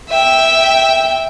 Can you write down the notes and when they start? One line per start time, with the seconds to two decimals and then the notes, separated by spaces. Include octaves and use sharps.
0.10 E5 G5